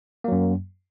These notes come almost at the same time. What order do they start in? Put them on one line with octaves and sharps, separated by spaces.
A#3 F#3 F#2